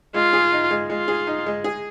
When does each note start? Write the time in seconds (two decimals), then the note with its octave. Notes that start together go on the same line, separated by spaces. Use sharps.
0.14 G#3 F4
0.33 G#4
0.52 D#4
0.71 G#3
0.89 G#3 F4
1.08 G#4
1.27 D#4
1.46 G#3
1.64 G#4